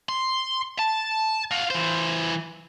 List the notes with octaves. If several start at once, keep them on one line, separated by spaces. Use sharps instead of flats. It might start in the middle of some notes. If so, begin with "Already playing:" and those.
C6
A5
F4 F#4
E3 C5